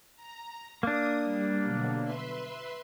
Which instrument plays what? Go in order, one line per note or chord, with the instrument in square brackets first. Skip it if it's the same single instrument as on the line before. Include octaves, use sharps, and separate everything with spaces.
[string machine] A#5
[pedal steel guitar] A#3 D4 [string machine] D#6
[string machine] G3
B2 D3 F#3
B4 E5 C6